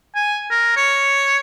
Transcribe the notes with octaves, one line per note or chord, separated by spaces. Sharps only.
G#5
A#4
C#5